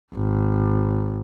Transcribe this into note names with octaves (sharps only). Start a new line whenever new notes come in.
G#1